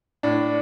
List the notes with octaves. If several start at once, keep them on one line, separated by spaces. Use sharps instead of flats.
A2 D4